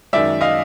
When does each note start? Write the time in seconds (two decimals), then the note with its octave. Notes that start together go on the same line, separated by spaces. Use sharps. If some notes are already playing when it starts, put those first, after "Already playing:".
0.13 F#2 D#3 G#3 D5 E5
0.41 D#5 F5